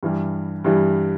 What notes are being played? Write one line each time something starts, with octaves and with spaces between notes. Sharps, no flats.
G2 E3 G3
G2 E3 G3